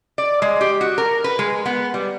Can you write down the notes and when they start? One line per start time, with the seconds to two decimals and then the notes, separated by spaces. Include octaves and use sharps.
0.18 D5
0.42 G#3
0.61 G4
0.81 F#4
0.98 A#4
1.24 B4
1.39 G#3
1.66 B3
1.94 G3